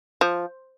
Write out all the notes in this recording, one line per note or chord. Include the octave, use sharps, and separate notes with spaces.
F3